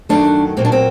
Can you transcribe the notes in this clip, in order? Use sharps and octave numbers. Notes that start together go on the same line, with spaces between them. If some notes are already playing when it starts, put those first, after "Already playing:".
F#2 D#3 F#3 A3 D4
A#2 F#3 A#3 C4
D4
C4